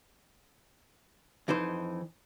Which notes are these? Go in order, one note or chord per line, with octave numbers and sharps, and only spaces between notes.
F2 E3 D#4 C5